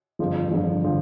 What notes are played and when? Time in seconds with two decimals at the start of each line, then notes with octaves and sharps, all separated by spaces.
0.19 G1 F2 D3 F3
0.51 G1 F2 D3 F3
0.84 D3 F3